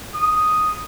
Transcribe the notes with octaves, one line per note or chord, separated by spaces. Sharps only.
D#6